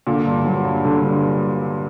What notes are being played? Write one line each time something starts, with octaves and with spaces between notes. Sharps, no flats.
A#2 D3
G2
F#3
G2
D3
G2